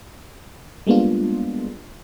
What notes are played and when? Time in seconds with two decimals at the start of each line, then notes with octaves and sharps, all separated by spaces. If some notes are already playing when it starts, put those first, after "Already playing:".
0.87 G3 G#3 A#3 B3 D4 F4